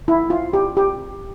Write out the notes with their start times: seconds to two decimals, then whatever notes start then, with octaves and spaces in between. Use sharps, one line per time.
0.08 E4
0.30 F4
0.53 G4
0.77 G4